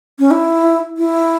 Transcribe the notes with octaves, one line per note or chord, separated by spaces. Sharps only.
C#4
E4
E4